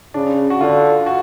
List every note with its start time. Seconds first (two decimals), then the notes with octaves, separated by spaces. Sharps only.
0.14 C#3 D4
0.50 F#4
0.61 D3 F4
1.06 F#4